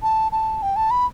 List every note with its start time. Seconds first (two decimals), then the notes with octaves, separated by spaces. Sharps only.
0.03 A5
0.32 A5
0.62 G5
0.76 A5
0.91 B5